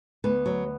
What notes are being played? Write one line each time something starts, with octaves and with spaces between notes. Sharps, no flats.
D2 B3 B4
F#3